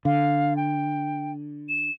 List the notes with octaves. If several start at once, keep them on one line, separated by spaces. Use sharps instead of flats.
D3 F5
G5
E7